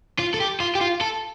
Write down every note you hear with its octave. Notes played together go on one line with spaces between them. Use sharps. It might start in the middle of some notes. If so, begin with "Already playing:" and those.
F4
A4
G4
F4
G4
F4
A4